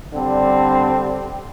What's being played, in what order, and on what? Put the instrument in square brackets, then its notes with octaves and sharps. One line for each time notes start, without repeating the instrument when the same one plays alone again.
[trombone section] D3 G3 C4 D4